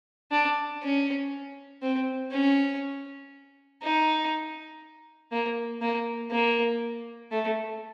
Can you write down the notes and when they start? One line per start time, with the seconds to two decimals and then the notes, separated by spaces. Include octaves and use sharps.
0.31 D4
0.82 C#4
1.82 C4
2.31 C#4
3.82 D#4
5.32 A#3
5.81 A#3
6.31 A#3
7.31 A3